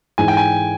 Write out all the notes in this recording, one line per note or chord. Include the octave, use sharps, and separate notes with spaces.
G#2 E3 G#3 G#5
G5
G#5